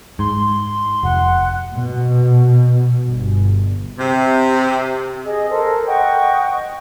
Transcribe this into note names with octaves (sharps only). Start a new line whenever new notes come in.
G#2 C6
F1 F#5
B2
G1
C3
G#4 D#5
A4 A#4 C5
D#5 F#5 G5 C#6